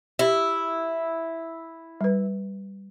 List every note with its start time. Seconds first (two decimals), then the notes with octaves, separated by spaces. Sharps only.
0.19 E4 G4
2.01 G3 B4